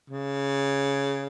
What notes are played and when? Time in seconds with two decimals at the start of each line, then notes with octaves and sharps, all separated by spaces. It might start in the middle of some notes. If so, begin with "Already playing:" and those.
0.10 C#3